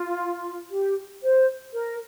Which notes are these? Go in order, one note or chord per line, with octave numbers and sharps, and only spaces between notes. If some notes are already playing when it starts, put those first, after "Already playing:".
Already playing: F4
G4
C5
A#4